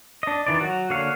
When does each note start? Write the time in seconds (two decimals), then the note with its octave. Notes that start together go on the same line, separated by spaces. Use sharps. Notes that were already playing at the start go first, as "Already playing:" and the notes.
0.23 D4 D#5
0.46 D#3 E3 D5
0.61 F#3 F#4
0.90 D3 A#3 C#5 F5 F#5